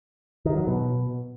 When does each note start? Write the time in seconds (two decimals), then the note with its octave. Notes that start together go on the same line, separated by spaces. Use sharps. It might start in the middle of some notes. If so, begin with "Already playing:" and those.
0.45 D#3
0.56 F#3
0.67 B2